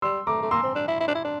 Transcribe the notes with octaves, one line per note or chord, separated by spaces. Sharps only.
G3 C6 E6
A3 A#5 D6
A3
A#3 C6 E6
C4
D4
E4
E4
D4
E4
D4